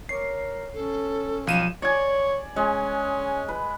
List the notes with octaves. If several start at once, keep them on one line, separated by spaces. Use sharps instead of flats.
A#4 C#5 D6 C7
C#4 A4
B1 F3 G3 F5 D#7 E7
C#5 D5 G#5
G#3 C#4
B4